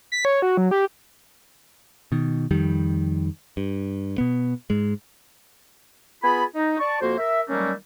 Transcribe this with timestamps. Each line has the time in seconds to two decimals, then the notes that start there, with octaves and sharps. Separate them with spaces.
0.12 B6
0.25 C#5
0.42 F#4
0.57 F#3
0.71 G4
2.12 B2 D#3
2.51 F2 D#3 G3
3.57 G2
4.18 B2 B3
4.70 G#2 G#3
6.23 B3 F4 G#4 G#5 B5
6.55 D#4
6.80 D5 A5 C#6
7.02 F2 A#3 F#4 C5
7.19 A#4 E5
7.49 D#3 F#3 G3 A3 A#3 C#4